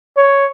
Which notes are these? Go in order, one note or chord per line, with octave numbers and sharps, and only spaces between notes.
C#5